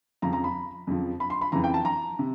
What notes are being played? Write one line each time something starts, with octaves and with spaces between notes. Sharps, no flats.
F2 C#3 F3 A#5
A#5
B5
F2 C#3 F3
B5
C6
B5
F2 C#3 E3 A#5
G5
A5
A#5
C3